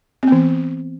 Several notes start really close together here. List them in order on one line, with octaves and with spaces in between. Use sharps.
C4 B3 E3